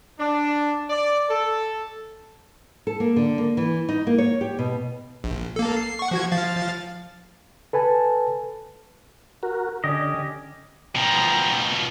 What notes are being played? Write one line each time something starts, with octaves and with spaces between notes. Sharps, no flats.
D4
D5
A4
A4
A#3
D3
A#3
E3
D#4
A#3
C#5
G4
B2
A#1
A#3 A4
C7
F#5 C#6
F3 F#4 G#6
F3 F5 A6
A4 B4 G#5 A5
F#4 A#4
D3 C#4 G4 D#5
B2 F3 G5 A#5